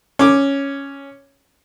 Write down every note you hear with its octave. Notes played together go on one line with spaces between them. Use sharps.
C#4 D6